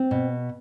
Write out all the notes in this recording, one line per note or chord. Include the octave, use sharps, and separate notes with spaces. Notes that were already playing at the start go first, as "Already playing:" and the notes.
Already playing: C4
B2